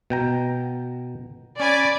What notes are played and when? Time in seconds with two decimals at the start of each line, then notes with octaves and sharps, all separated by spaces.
0.10 B2 G5 A#5
1.60 C#4 D5 G#5 B5